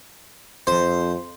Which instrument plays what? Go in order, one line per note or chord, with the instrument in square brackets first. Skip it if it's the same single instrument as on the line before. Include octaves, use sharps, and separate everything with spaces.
[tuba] F2 [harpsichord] C5